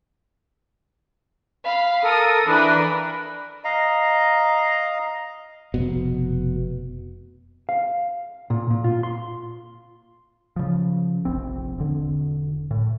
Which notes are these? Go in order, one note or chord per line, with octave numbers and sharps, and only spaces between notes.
F5 B5
A4 A#4 D#6
E3 D4 A#4 B4 B5
D#5 F5 A#5
F1 B2
F5
A#2
A#2
F4
C6
C#3 F3
F1 A#1 C4
E1 D3
A2